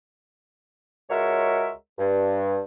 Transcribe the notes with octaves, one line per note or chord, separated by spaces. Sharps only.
C#2 G#3 F#4 A#4 C#5 E5
G2